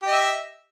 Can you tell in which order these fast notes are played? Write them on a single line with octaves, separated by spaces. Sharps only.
G4 D#5 E5